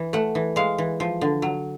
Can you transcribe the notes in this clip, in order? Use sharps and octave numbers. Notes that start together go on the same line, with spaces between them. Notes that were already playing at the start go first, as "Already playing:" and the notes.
Already playing: E3
A3 F#5
E3
G#3 F5
E3
F3
D3
F#3